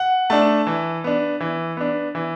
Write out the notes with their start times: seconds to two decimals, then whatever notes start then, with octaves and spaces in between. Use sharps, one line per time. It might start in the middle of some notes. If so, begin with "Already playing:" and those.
Already playing: F#5
0.30 A3 D4 A5
0.67 E3
1.04 B3 D4
1.40 E3
1.77 B3 D4
2.15 E3